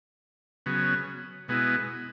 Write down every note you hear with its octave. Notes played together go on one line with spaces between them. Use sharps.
C#3 F#3 B3
B2 G#3 B3 E4